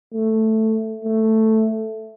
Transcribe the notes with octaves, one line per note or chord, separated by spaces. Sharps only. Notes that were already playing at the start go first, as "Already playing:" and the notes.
A3
A3